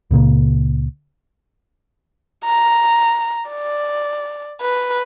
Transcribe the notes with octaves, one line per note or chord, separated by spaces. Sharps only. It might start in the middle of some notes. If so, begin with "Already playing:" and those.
C#2 A#2 C#3 A#3
A#5
D5
B4